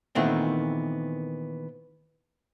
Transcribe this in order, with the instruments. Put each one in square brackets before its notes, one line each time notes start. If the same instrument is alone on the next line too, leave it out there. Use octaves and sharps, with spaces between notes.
[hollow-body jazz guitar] A#2 D#3 E3 A3 B3 C4